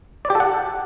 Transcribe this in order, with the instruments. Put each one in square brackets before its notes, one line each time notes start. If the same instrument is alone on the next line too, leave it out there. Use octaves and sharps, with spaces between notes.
[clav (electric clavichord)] D5
G4
A4
F#5